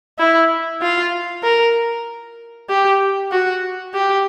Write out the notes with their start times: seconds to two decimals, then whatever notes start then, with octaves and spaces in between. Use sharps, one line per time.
0.19 E4
0.82 F4
1.43 A#4
2.70 G4
3.31 F#4
3.94 G4